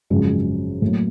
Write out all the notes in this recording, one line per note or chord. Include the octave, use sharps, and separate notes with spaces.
G#1 F#2 C#3 F3 G#3
A2 F#3 A#3